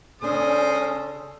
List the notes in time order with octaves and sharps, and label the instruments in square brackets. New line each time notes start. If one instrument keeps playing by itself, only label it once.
[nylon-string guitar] C#3 D4 [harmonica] G#3 C5 D#6 [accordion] C#4 [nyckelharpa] A4